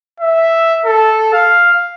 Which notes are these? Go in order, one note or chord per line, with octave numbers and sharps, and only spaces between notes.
E5
A4
F5